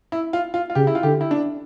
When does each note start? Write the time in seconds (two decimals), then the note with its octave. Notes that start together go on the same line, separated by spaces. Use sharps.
0.12 E4
0.33 F4
0.54 F4
0.70 F4
0.75 C#3 G4
0.87 E4
0.95 F4
1.03 D3 G4
1.21 E4
1.31 D4